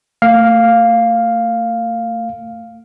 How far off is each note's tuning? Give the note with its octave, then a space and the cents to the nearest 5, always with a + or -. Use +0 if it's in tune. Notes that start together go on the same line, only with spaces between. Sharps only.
A3 +40 F5 +0